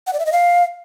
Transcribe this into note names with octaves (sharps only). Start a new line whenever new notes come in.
F#5
D5
E5
D#5
F5